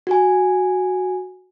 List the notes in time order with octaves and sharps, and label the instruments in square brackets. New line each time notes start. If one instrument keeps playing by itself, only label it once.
[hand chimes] F#4 G#5